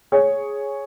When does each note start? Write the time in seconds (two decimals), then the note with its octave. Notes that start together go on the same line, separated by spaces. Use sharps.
0.12 G#4 C#5